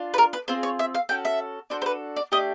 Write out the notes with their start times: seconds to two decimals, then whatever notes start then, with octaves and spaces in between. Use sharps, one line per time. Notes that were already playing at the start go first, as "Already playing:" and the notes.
Already playing: D4 F4
0.14 B4
0.18 A#4
0.33 B4
0.48 C4 F4 G#4 C5
0.63 C#5
0.79 E5
0.94 F5
1.09 C#4 F#4 A4 G5
1.25 E5
1.70 D4 F#4 A4 C5
1.82 C5
1.86 B4
2.16 D5
2.32 A3 D4 G4 D#5